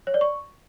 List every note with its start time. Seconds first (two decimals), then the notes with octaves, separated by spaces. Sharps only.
0.07 C#5
0.14 D5
0.21 C#6